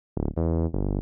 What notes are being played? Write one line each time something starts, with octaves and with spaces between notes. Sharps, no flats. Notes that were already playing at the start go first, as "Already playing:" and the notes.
D1
E2
G1